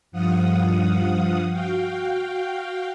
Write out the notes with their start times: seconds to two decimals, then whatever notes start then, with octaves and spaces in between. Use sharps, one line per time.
0.12 G2 F3 F5 F#5 D#6
1.51 F#4 F5 G5